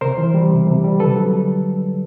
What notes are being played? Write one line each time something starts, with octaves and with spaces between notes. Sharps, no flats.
C3 A#4 C5
E3
G3
C3
C3
G3
D3 A4 B4
F#3